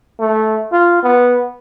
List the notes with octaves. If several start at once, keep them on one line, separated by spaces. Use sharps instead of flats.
A3
F4
B3